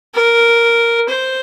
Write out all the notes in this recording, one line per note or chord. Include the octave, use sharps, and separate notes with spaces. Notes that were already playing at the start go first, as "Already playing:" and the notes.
A#4
C5